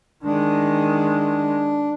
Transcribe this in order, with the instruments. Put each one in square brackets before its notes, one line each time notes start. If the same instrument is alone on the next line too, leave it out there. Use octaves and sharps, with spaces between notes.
[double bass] D#3 G#3 [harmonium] D4